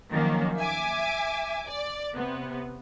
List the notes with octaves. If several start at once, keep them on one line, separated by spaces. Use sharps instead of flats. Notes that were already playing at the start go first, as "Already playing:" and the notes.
D#3 F3 F#3 A#3 C#4
E5 G#5 D6
D5
C3 B3